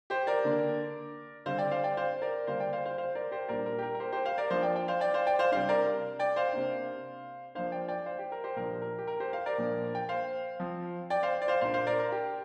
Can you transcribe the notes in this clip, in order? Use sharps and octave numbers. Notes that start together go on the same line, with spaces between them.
G4 C5
A#4 D5
D3 A#3 D4
D3 G3 C4 C5 F5
D5 G5
C5 F5
D5 G5
C5 F5
A#4 D5
D3 G3 A#3 D4 C5 F5
D5 G5
C5 F5
C5 F5
C5 F5
A#4 D5
G4 C5
A#2 G3 A#3 D4 A#4 D5
A#4
G4
A#4
A#4
G4 C5
G4 C5
C5 F5
A#4 D5
F3 A#3 D4 C5 F5
D5 G5
D5 G5
C5 F5
D5 G5
C5 F5
D5 G5
C5 F5
C3 G3 D4 C5 F5
A#4 D5
D5 G5
C5 F5
C3 A#3 D4
F3 A#3 D4 C5 F5
D5 G5
D5 G5
C5 F5
G4
A#4
G4 C5
A#2 F3 D4 A#4
A#4
G4
A#4
G4 C5
C5 F5
A#4 D5
A#2 F3 A#3 D4
G5
C5 F5
F3 C4
D5 G5
C5 F5
D5
C5 F5
A#2 A#3 D4 C5 F5
C5 F5
A#4 D5
A#4
G4